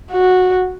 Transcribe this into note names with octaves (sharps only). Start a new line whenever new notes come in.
F#4